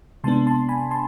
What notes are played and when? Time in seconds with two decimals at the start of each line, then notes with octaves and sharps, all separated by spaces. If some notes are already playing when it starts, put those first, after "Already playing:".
0.24 C3 G#3 B3 D4 A5 C6
0.47 A5 C6
0.69 G#5 B5
0.91 A5 C6